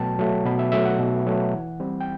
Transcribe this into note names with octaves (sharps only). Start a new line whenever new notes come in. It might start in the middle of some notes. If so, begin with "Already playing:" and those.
Already playing: B2 F#3 A3 G5 A5
F#3 A3
B2 B5
E5
F#3 A3 E5
F#5
B2
F#3 A3
E3
G3 C4
G5